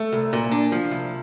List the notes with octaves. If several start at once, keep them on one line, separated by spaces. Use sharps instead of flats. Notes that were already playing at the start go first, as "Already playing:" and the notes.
Already playing: A3
C2
A#2
D4
F3
C2